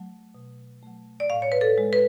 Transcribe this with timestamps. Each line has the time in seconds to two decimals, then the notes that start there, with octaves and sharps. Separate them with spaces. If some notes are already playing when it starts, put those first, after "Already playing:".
Already playing: F#3 A3
0.35 B2
0.82 F#3 A3
1.20 D5
1.30 A2 F5
1.42 C#5
1.52 B4
1.61 A4
1.78 G#3
1.93 B4